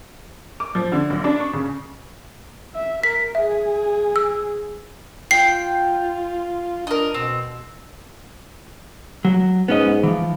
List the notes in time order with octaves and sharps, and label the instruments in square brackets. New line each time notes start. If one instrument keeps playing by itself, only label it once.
[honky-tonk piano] D6
F3
D3
B1
D4
C#6
C#3
[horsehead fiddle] E5
[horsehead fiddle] A#4 [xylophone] B6
[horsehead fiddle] G#4 [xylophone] E5
[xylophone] E6
[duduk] F4 [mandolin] G5 [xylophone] C7
[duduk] D4 [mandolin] A#4 D#5
[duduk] B2 [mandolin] C4
[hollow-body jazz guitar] F#3
[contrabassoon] G#2 [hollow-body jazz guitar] B3 C#4 D#5
[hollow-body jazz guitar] E3 F3